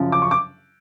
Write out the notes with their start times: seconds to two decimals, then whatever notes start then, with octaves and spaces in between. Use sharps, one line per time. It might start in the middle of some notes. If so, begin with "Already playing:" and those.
Already playing: F#2 C#3 F3
0.12 D6
0.22 C#6
0.31 D6